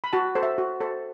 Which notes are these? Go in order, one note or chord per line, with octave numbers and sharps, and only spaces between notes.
B5
F#4 A5
A4 C5
E5
F#4
A4 C5